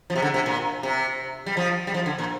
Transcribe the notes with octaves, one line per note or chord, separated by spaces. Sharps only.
F3
C3
D3
C3
A#2
C3
G3
F3
G3
F3
D3
A#2